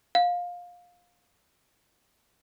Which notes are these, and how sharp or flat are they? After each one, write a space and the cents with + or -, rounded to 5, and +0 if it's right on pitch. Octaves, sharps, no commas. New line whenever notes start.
F5 +20